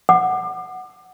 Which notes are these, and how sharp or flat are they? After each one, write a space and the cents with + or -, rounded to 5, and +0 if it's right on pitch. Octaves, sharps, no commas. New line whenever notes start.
F#5 +0 D6 +35